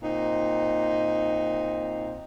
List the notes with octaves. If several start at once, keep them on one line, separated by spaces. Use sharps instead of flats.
A#2 C4 D#4